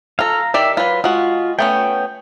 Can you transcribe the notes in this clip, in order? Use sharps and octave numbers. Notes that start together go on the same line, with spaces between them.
F4 A4 F5 A#5
D#3 G4 D5 E5
F#3 F4 B4
G#3 F4 F#4
A3 B3 C#4 G5